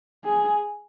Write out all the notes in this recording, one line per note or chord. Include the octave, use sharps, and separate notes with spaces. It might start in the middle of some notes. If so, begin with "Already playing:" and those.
G#4